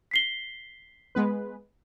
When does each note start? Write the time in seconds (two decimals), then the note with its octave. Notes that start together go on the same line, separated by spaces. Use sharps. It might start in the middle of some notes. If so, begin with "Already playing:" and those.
0.11 B6 C7 G7
1.15 G#3 B3 B4